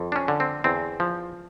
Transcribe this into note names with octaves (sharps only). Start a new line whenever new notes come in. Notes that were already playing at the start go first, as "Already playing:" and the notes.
Already playing: F2
D4
C#4
D3
C4
E2 C4
F3